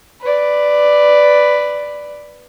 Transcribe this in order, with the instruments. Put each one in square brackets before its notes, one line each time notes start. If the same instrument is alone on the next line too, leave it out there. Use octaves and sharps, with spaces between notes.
[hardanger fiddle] B4 D5